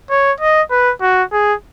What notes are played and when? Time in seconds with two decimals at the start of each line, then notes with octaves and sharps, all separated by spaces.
0.11 C#5
0.40 D#5
0.71 B4
1.02 F#4
1.33 G#4